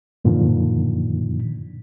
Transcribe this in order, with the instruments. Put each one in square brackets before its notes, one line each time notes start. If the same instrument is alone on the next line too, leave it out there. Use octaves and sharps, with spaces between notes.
[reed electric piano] F#2 A#2 D3 D#3 F3